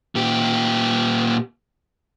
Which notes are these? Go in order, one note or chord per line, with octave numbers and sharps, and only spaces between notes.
A#2 G4